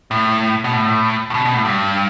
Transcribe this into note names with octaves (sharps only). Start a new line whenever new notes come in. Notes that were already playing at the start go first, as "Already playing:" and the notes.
A2
B2
A2
A2
B2
B2
A2
G2